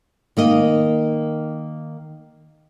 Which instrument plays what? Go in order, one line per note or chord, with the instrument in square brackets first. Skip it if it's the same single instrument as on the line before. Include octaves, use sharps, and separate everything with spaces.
[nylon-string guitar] D#3 A#3 D#5